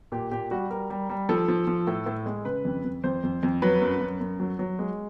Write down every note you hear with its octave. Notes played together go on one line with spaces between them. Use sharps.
A#2 G4
A#2 G4
G3 F#4
G3 A#4
G3
G3
F3 A4
F3
F3
A2
A2
G#3
C#3 B4
F2
F2
F2 C5
F2
F2
F#3 B4
F#2
F#2
F#2
F#3
F#3
G#3